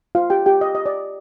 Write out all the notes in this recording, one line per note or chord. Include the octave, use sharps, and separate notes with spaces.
F4 C5 F5
G4 G5
G4 G5
D#5
D#5
D5